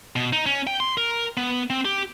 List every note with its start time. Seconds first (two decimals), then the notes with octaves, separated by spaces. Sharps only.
0.16 B2
0.33 D#4
0.46 C#4
0.67 G5
0.80 C6
0.98 A#4
1.37 B3
1.70 C4
1.85 G4